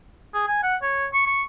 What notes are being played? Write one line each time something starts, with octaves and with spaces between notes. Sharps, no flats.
G#4
G#5
F#5
C#5
C#6
C#6